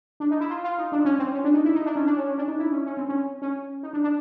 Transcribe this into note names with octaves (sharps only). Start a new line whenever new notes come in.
D4
D#4
E4
F4
F4
D#4
D4
C#4
C4
C#4
D4
D#4
E4
D#4
D4
C#4
D4
C#4
C#4
D4
D#4
E4
C#4
C#4
C4
C#4
C#4
D#4
D4
D4